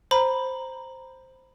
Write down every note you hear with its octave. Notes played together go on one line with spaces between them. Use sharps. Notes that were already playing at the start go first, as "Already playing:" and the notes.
C5 A#5 B5